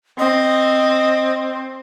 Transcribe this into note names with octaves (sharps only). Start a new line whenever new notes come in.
C4 D#5